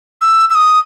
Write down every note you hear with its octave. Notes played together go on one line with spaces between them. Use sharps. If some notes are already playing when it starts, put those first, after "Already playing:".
E6
E6
D#6